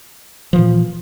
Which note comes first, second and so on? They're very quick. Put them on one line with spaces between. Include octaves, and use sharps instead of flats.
F3 E3 A#2